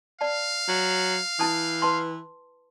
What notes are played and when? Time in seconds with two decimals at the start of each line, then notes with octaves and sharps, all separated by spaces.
0.21 D5 F5 A5
0.68 F#3
1.39 E3 E4 A5 D#6
1.82 B4 A5 C6